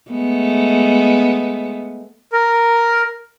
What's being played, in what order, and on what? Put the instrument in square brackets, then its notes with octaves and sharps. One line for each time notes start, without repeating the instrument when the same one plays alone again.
[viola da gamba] G#3 A3 B3
[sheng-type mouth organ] A#4